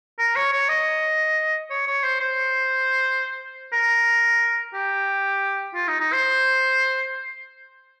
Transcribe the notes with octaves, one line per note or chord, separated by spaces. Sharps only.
A#4
C#5
C#5
D#5
C#5
C#5
C5
C5
A#4
G4
F4
D#4
D#4
C5